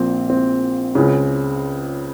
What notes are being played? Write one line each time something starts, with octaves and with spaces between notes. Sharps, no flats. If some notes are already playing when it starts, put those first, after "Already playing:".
Already playing: A#1 A#2 C4
C4
C#2 C#3